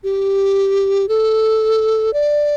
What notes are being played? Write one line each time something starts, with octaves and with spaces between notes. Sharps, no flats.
G4
A4
D5